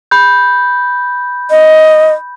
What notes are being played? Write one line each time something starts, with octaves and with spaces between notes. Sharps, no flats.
B5 G6
D#5